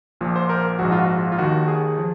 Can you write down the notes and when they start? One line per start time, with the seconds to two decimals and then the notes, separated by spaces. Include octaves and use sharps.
0.21 A#1 A#2 F3
0.36 C5
0.49 A#4
0.79 A#1 G#2 F3 F#4
0.92 F4
0.99 F#4
1.18 F4
1.32 F4
1.38 D#2 D#3 F#4
1.68 G#4
1.98 F3